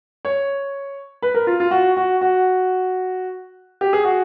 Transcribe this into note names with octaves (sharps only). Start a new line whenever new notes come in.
C#5
B4
A#4
F4
F4
F#4
F#4
F#4
G4
G#4
F#4